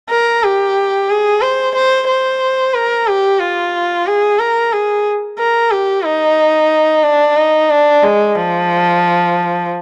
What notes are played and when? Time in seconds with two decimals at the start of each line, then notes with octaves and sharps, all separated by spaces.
0.10 A#4
0.43 G4
1.10 G#4
1.42 C5
1.75 C5
2.08 C5
2.74 A#4
3.07 G4
3.41 F4
4.06 G#4
4.39 A#4
4.73 G#4
5.39 A#4
5.72 G4
6.05 D#4
7.03 D4
7.37 D#4
7.70 D4
8.03 G#3
8.36 F3